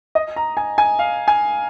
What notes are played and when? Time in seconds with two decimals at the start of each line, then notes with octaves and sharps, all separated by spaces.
0.15 D#5
0.36 A#5
0.57 G#5
0.78 G#5
0.99 F5
1.28 G#5